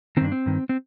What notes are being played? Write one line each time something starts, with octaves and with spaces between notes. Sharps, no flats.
G2 D#3 C4 D4
C4
G2 D#3
C4